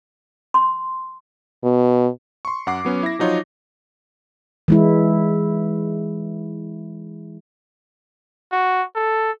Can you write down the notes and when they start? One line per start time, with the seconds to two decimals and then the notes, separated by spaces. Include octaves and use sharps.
0.54 C6
1.64 B2
2.45 C6 C#6
2.67 F#2 F#5 D6 C7
2.85 F#3 B3 C#4
3.03 E4 A#6
3.19 F3 F#3 D#4 F4 C#5
4.68 E3 G#3 E4
8.52 F#4
8.95 A4